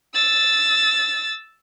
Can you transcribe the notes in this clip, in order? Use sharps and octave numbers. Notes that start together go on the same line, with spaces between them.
E6 A6